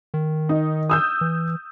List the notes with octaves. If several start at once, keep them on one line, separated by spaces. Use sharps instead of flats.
D#3
D#4
D#6 E6 G6
E3